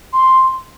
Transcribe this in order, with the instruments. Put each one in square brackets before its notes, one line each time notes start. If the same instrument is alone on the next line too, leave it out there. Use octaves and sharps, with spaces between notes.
[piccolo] C6